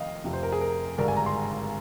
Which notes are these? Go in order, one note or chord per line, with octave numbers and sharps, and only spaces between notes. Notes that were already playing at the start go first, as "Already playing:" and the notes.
Already playing: F1 F2 D#3 D#5 F5
F1 F2 C3
C5
A#4
G#4
A#4
G#1 G2 D3 G3 D4 A#4
G#5
A#5
C6